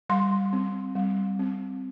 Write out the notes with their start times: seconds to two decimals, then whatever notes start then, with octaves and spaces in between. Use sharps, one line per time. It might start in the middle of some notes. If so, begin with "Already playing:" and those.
0.09 G3 C6
0.53 C4
0.95 G3
1.39 C4